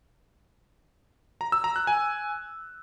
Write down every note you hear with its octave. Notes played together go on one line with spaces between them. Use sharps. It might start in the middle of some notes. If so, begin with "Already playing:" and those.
A#5
E6
A#5
F#6
G#5